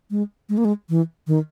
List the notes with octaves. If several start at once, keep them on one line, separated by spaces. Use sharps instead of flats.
G#3
G#3
A#3
G#3
E3
D#3